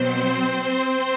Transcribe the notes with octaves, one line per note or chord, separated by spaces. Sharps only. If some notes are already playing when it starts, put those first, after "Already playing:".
Already playing: B2 F#3 B3 C4 C5